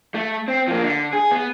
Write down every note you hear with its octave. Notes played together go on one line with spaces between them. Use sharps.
A3
C4
F3 A#3
D3
G#4
B3